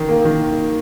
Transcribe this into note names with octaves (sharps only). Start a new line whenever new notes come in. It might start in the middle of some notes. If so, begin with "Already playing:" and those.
Already playing: D#3
A#3
D#3